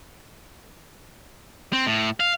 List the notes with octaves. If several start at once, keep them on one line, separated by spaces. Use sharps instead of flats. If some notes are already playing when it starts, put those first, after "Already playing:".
C4
A2
F5